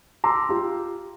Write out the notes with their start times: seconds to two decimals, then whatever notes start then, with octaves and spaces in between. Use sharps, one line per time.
0.24 A#5 C6 D6 E6
0.49 F4 G4